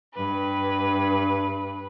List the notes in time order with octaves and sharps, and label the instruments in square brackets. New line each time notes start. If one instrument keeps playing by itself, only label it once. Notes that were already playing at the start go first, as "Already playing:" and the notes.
[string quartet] G2 B4